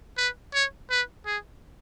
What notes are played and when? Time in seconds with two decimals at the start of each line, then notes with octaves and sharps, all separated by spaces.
0.17 B4
0.54 C#5
0.90 B4
1.26 G#4